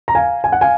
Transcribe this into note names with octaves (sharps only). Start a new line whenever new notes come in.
A#5
F5 G#5
G#5
F#5
F5 G#5